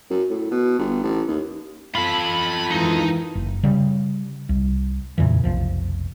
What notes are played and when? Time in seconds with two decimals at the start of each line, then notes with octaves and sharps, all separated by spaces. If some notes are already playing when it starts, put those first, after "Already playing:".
0.10 F#2
0.30 A2
0.51 B2
0.79 G1
1.03 A1
1.28 D#2
1.95 F4 A4 B5
2.71 G#2 D#3 E3 D#4
3.35 F#1
3.63 C#3 G3
4.49 C2
5.18 F2 A#2 C#3 E3
5.44 F1 B1 F3